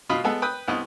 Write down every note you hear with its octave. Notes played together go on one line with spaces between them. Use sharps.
B2 F4 D#5 B5
G#3 B3 A4
B4 G5 D#6
C2 B3 D#5